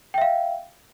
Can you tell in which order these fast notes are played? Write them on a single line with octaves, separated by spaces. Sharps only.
G5 E5 F5